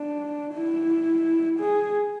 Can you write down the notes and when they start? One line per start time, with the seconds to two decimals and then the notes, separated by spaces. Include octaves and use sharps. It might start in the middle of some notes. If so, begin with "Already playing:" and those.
Already playing: D4
0.54 E4
1.60 G#4